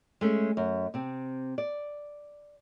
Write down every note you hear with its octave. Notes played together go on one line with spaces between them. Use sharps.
G#3 A3 C#4
F#2
C3 C4
D5